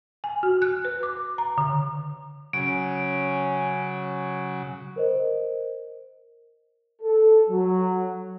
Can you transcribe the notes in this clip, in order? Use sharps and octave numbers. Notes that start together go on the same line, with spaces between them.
G#5
F#4
F#6
B4
D6
A#5
D3
C#3 F#3 C#4 D7
A#4 C5 D#5
A4
F#3